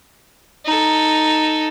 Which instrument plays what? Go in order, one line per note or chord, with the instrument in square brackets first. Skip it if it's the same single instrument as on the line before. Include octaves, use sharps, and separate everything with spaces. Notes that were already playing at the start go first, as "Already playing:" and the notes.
[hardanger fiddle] D#4 A4